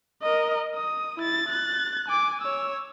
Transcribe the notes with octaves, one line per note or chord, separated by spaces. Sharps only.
A#4 D#5
D#6
E4 A6
F#6 A6
G#5 D6
C#5 E6